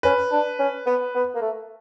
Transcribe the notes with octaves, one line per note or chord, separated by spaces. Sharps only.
C#4 B4
D4
C#4
B3
B3
A#3
A3